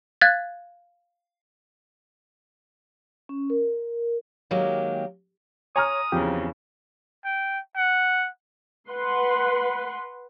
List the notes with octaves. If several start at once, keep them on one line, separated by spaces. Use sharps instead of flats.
F5 F#6 G#6 A6
C#4
A#4
D#3 F#3 G#3 A#3 G4
C#5 G#5 A#5 D#6 F6
E2 C#3 F3 C4 G4
G5
F#5
B4 F#5 C6